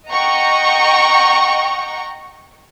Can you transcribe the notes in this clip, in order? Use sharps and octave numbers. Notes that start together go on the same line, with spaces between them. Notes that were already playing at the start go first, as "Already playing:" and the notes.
D#5 F#5 G5 A#5 C#6